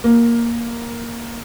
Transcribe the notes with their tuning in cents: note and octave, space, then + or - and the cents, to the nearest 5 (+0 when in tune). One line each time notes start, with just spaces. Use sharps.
A#3 +5